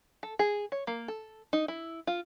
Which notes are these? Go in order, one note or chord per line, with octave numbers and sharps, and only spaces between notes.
A4
G#4
C#5
A#3
A4
D#4
E4
F4